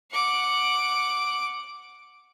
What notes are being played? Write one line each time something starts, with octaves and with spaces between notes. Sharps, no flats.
F#5 D6